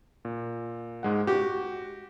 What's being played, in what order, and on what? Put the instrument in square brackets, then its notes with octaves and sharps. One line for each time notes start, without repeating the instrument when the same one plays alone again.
[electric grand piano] A#2
G#2 G#3 F#5
[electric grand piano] F#4 [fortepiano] G4